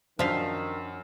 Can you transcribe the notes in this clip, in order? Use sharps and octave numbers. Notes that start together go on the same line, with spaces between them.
F#2 D#3 F3 D4 F4 B6 C7